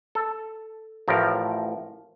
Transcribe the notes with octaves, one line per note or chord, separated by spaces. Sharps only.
A4
A1 A2 F3 A#4